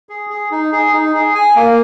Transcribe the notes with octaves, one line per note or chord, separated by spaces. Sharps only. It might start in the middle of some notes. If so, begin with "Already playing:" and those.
G#4
G#4
D#4
G#4
D#4
G#4
G#5
A#3